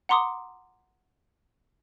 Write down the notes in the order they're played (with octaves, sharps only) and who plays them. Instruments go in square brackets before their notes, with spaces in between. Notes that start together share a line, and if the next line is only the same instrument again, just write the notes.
[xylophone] F#5 A#5 C6 D6 D#6